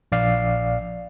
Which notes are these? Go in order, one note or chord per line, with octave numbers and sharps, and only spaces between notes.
A#1 D5 F5